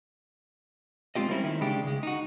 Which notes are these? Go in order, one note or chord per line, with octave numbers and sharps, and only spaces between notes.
G#3 C4 F4 G4 D#5
G3 A#3 C4 C#4 E4
D#3 D#4 E4
C#2 C#3 G#3 D4 G4
C#2 G#3
D#4 F#4